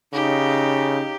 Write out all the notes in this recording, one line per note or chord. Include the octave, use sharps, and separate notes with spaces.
C#3 D#4 G4